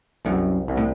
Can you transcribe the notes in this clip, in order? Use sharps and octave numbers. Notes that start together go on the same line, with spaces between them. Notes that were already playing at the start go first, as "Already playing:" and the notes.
C2 F#2
C2
A2